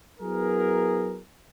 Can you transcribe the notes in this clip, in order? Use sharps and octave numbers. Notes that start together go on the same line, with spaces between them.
F#3 B3 E4 G#4 A#4